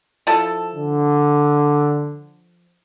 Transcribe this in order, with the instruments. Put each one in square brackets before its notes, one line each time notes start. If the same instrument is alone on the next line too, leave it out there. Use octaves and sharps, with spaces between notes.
[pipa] F3 E4 A4
[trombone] D3